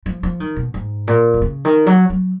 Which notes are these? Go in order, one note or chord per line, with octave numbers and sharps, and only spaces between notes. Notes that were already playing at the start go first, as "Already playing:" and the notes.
F3
F3
D#3
B2
G#2
A#2
D#3
C#3
D#3
F#3
F#3